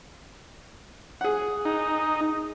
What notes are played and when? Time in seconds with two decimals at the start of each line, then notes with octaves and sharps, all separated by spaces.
1.21 G#4 F#5
1.65 D#4